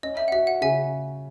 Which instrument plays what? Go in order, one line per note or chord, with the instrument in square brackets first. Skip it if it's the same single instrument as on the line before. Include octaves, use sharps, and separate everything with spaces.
[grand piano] C#4 [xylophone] D#5
[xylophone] E5
F#5
[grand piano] F#4 [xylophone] E5
[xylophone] F#5
[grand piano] C#3 [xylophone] E5 G#5